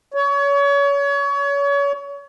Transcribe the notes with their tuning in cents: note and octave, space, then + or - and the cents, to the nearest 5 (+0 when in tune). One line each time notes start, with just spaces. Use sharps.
C#5 +30